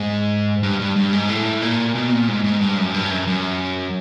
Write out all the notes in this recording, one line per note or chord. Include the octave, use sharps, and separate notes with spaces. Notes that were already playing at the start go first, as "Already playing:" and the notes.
Already playing: G#2
G2
G2
G2
G#2
A2
A#2
B2
A#2
G#2
G#2
G2
F#2
G2
F#2
F#2